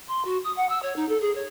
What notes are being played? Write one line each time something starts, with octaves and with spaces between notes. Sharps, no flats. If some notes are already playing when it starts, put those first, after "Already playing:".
C6
F#4
D#6
F#5
E6
C#5
D#4
A4
G#4
C#5